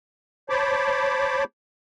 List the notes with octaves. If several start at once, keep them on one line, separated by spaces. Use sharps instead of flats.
C5 C#5 A5 B5 D6